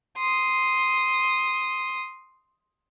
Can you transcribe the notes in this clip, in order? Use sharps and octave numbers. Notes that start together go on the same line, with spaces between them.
C6 D#6